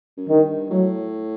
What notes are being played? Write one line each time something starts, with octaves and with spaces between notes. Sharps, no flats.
F#2
G2 D#3
A2 F#3